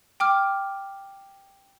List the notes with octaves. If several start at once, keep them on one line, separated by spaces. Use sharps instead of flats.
G5 D6 F6